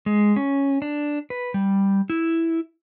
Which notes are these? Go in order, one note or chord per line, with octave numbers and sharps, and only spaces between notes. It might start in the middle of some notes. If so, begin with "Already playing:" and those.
G#3
C#4
D4
B4
G3
E4